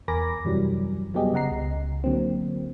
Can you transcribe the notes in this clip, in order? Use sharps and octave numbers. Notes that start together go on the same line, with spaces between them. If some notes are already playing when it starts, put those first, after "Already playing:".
E2 A#4 G#5 B5 D6 A#6
F#2 C3 E3 F#3 G3
F#3 G3 B3 G4 G#4 D#5
C#3 D#5 F#5 A#5 C7
C#2
D3 F#3 A#3 C4